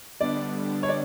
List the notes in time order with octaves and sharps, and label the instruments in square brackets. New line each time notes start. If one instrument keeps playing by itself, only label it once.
[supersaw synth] D3 G3 B3 D4 [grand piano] D5
[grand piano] C#5
D5